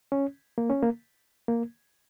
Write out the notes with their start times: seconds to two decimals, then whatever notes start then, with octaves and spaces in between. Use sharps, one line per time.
0.12 C#4
0.58 A#3
0.69 C#4
0.83 A#3
1.48 A#3